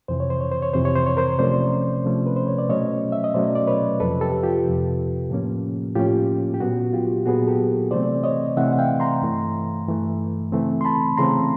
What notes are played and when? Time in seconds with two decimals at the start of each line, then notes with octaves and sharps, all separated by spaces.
0.08 F2 C3 E3 C5
0.20 C#5
0.30 C5
0.41 C#5
0.52 C5
0.62 C#5
0.74 F2 C3 E3 C5
0.85 C#5
0.96 C5
1.07 C#5
1.17 A#4 C5
1.39 C3 F3 A3 C#4 C5 D5
2.04 C3 F3 A3 C#4
2.26 B4
2.36 C5
2.47 C#5
2.58 D5
2.69 B2 F#3 A3 C#4 C#5 D#5
3.12 E5
3.24 D#5
3.34 B2 F#3 A3 C#4 C5 D5
3.55 D5
3.67 B4 C#5
4.00 F2 C3 F3 A4 B4
4.21 G4 A4
4.43 F4 G4
4.65 F2 C3 F3
5.30 A2 F3 A#3 C#4
5.95 A2 F3 A#3 C#4 F4 G4
6.54 G4
6.60 A#2 F#3 B3 F#4
6.93 F4 G4
7.26 A#2 F#3 B3 F#4 G#4
7.47 G4 A4
7.91 C3 E3 A3 C4 C5 D5
8.24 C#5 D#5
8.57 C3 E3 A3 C4 E5 F#5
8.73 F#5
8.79 F5 G5
9.00 A#5 C6
9.22 G2 E3 A3
9.88 G2 E3 A3
10.52 C#3 E3 A3 C4
10.81 C6
10.85 A5 B5
11.17 C#3 E3 A3 C4 A#5 C6